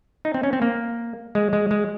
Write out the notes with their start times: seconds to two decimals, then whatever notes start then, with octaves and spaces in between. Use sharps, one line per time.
0.25 D#4
0.34 C4
0.43 C#4
0.53 C4
0.62 A#3
1.35 G#3
1.53 G#3
1.71 G#3